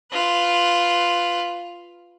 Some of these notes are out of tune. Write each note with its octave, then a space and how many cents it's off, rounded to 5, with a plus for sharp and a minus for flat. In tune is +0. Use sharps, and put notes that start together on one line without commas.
F4 +0 B4 +10